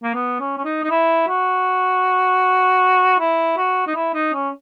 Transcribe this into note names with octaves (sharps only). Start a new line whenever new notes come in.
A#3
B3
C#4
C#4
D#4
D#4
E4
F#4
E4
F#4
D#4
E4
D#4
C#4